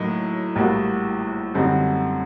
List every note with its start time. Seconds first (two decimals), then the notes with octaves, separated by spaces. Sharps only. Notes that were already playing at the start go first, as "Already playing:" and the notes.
Already playing: A2 F#3 A#3 D#4
0.56 A#1 A2 G3 A#3 F#4
1.54 F#2 D3 G3 C4 D#4